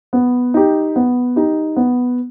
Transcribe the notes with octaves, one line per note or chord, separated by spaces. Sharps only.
B3
D#4 G4
B3
D#4 G4
B3